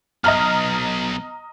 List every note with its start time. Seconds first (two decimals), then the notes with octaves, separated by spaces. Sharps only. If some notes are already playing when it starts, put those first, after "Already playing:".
0.24 B1 D#5 A#5 F6